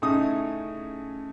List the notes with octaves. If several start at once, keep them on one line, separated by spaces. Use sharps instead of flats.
A2 C#3 D#4 D#6